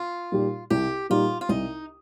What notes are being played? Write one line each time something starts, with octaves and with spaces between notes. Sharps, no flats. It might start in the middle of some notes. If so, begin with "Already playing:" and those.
Already playing: F4
A#2 G3 D#4 G4
C2 G4
A#2 G3 D#4 F4 G4
F4
C2 D#4